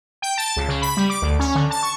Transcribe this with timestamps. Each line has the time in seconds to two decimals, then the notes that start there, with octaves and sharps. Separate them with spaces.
0.22 G5
0.38 A5
0.56 C#2
0.68 C#3
0.82 B5
0.97 G3
1.10 D6
1.22 D2
1.39 C#4
1.55 D3
1.71 A5
1.83 C#6